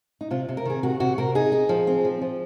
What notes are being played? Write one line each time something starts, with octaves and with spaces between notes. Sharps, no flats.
D#4
C3 F4
C3
A#4
D#3 G#4
C3 F#4
C3 F#4
C3 A#4
D#4 G#4
D#4
F3
C4
F3
F3